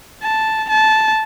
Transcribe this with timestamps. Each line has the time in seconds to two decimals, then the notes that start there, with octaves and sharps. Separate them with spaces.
0.23 A5
0.70 A5